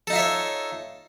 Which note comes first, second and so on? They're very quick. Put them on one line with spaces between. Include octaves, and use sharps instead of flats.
A4 D#4 F4 E5 C#5